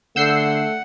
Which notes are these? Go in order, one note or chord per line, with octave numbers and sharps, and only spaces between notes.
D3 A3 F#5 E6 G6 C7